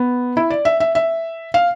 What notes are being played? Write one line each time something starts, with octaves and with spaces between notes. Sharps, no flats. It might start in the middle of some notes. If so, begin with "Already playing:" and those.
Already playing: B3
E4
D5
E5
E5
E5
F5